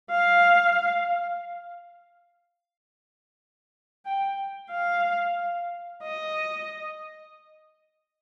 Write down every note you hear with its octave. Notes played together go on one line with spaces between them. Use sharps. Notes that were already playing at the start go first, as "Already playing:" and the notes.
F5
G5
F5
D#5